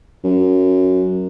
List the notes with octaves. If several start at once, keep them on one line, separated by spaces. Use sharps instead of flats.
F#2